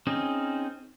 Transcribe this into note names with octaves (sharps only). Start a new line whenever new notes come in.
C4 C#4 D#4 G#4